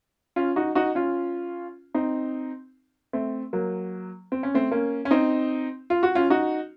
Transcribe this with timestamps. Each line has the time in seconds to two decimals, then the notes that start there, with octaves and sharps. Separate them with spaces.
0.36 C#4 F4
0.56 D#4 F#4
0.75 D#4 F#4
0.95 C#4 F4
1.94 C4 D#4
3.13 A3 C4
3.53 F#3 A#3
4.32 C4
4.43 C#4
4.54 A3 C4
4.71 A#3 C#4
5.05 C#4
5.11 C4 D#4
5.90 F4
6.03 F#4
6.15 C#4 F4
6.30 D#4 F#4